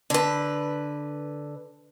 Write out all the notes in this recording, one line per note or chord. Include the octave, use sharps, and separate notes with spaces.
D3 B4